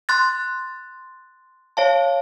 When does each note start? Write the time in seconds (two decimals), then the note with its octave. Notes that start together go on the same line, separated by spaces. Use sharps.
0.09 C6 F#6 A6
1.77 C#5 F5 A5